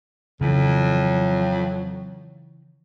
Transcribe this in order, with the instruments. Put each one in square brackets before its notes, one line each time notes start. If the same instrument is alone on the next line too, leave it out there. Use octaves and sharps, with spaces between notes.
[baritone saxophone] F2 [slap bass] C#3 E3 [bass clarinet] F#3